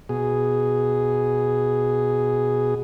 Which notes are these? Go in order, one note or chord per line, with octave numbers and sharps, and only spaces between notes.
B2 G#4